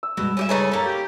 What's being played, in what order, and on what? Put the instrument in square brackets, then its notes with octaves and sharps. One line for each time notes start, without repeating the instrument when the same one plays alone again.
[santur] E6
[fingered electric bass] F#2 G3 G#3 [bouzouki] B2
[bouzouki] C#4 G4 E5
[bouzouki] C#3 C#5 G#5 [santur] D#4 B4 [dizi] A4
[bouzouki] A#3 C#4 [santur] A#5 B5
[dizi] G4